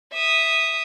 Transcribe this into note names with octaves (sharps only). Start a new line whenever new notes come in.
E5 D#6